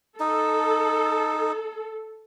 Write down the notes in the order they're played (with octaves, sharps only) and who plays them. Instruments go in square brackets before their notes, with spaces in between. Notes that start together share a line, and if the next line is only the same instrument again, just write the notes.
[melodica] D#4 [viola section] A4